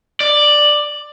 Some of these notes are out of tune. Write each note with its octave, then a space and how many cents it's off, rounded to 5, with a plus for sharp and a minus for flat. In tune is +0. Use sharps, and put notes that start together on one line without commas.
D5 +10